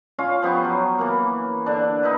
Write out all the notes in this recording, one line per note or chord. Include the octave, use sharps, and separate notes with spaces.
C#4 F4 F5
F3 B3 G4 C#6
F#3
E3 A#3
D3 D4
D#4 E4 B4